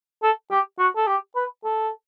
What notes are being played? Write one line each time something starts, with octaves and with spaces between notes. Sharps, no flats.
A4
G4
F#4
A4
G4
B4
A4